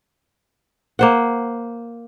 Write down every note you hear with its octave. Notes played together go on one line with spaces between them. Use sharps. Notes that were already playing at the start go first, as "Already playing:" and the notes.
A#3 C5 F#5